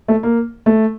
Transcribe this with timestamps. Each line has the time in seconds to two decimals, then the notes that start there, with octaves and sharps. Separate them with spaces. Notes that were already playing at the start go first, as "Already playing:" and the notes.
0.08 A3
0.23 A#3
0.66 A3